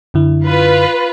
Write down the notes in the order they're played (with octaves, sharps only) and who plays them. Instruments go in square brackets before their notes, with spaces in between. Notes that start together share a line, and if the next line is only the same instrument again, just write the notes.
[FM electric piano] F#2 D3 E4
[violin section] F4 B4